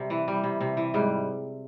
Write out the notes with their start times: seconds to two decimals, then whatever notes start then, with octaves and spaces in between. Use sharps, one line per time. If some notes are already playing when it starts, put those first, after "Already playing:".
Already playing: C3 G3
0.10 E3
0.28 G3
0.44 C3
0.61 C3
0.77 E3
0.94 G#2 G3